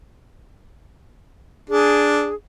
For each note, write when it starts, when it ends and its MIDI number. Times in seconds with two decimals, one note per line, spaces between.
1.69 2.30 62
1.69 2.34 68